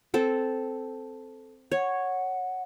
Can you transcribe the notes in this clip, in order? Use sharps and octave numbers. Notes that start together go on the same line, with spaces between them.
C4 A4
C#5 F#5